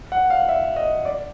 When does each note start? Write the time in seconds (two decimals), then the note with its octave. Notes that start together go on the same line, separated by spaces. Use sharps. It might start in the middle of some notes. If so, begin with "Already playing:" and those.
0.12 F#5
0.30 F5
0.49 E5
0.76 D#5
1.05 D5